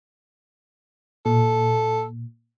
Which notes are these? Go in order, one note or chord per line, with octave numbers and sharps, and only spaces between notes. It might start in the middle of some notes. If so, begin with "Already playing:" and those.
A#2 A4